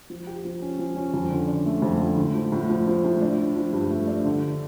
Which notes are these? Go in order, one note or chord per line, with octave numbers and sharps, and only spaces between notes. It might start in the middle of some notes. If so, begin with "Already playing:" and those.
F3
G4
F3
C#4
F3
C#4
F2
D3
D4
A3
F2
D3
A2
F3
A2
F3
F3
A2
D4
D4
F3
G2
A3
D4
D3
D4